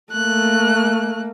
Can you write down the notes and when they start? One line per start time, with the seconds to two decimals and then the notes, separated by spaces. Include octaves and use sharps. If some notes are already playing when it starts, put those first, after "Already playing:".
0.12 A3 A#3 F#6